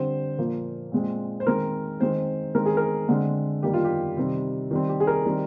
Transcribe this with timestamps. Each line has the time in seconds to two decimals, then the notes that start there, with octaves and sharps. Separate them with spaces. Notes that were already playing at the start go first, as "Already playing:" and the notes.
Already playing: D3 G3 C4 C5
0.38 A#2 F3 A#3
0.92 A#2 G#3 C4
1.40 C5
1.46 D#3 G#3 C4 A#4
2.00 D#3 G#3 C4 C5
2.54 D#3 G#3 C4 A#4
2.66 G#4
2.77 A#4
3.08 D3 G#3 C4
3.63 D#3 G3 A#3 G4
3.74 F4
3.84 G4
4.17 C3 D#3 G3 C4
4.71 D#3 G3 C4
4.89 G4
5.00 G#4
5.07 A#4
5.25 D#3 G3 C4